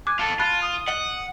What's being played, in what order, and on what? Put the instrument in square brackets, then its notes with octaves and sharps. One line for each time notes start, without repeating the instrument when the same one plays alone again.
[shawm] G#5 [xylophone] D6 F#6
[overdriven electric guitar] F4 A4 [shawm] A5
[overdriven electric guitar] F4 [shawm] A5 [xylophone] B5 F#6
[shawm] D#6
[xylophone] D#5 F#7 G7 [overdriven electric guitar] F#5